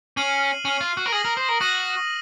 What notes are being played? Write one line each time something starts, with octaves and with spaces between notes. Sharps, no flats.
C#4 F6 C7 D#7 F#7
C#4 F6 C7 D#7 F#7
F4
F#4
A#4
G#4 D#6 A#6 D#7 F#7
A#4
C5
A#4
F#4 D#6 A#6 D#7 F#7